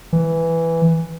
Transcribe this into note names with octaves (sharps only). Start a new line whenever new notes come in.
E3